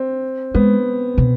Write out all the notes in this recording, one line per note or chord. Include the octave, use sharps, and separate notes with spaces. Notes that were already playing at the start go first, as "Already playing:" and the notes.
Already playing: C4
G#3 B3
B2